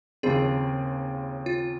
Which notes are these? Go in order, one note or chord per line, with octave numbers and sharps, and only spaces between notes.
D#2 C#3 F3 C4 F4 G#4
F4